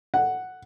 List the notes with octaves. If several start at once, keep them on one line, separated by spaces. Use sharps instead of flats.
F#5